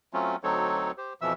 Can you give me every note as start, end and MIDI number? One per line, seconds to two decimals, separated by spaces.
0.13 0.36 54
0.13 0.36 57
0.13 0.36 60
0.13 0.36 61
0.13 0.36 65
0.43 0.91 38
0.43 0.91 54
0.43 0.91 60
0.43 0.91 63
0.43 0.91 69
0.43 0.91 73
0.98 1.13 67
0.98 1.13 72
1.21 1.33 41
1.21 1.33 47
1.21 1.33 52
1.21 1.33 53
1.21 1.33 76
1.21 1.33 88